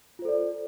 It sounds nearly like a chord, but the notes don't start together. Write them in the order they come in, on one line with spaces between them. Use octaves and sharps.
F4 C5 A4 D5